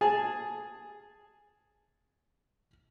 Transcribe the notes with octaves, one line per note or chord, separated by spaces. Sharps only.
G#4 G#5 A5